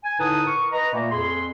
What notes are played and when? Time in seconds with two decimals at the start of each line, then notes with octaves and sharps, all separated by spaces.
0.03 G#5
0.20 A2 D3 D#4 B4 A5 D#6
0.47 A#4 C#6
0.72 B4 D#5 A#5
0.93 A#2 A3 A#3
1.12 F2 G#4 B5 C6